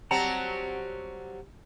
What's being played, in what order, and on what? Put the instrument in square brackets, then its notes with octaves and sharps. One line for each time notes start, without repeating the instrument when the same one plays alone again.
[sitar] F#3 G3 C4 [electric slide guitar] F#5 A5 A#5